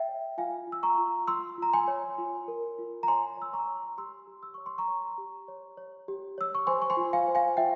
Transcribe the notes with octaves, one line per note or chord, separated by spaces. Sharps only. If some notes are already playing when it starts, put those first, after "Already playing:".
Already playing: E5 G5
C#5
F4 F5 G#5
F4
E6
A#5 C#6
F4
F4 C6 E6
F4 A#5
G#5 C6
C#5
F4
A#4
F4
A#5
C#5 G#5 C6
C#5 E6
A#5 C#6
C#5
G4 C6 E6
G4
E6
C#5 C#6
C6
A#5 C#6
C#5
G4
C#5
C#5
G4
C#5 E6
C#6
C5 G#5 C6
C#6
G#5 C6
F4
F5 G#5
C5
F5 G#5
F4 E5 G5